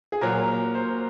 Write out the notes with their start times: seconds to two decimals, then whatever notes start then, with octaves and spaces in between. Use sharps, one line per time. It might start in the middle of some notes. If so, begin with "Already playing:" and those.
0.12 G#4
0.21 A#2 F#3 A#4
0.75 C5